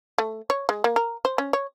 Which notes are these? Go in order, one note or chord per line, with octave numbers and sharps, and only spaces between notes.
A3
C#5
G#3
A#3
A#4
C5
C#4
C#5